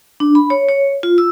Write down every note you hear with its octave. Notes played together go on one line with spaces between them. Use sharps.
D4
B5
C#5
C#5
F4
E6